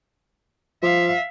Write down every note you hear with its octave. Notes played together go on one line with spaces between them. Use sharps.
F3 E5 F5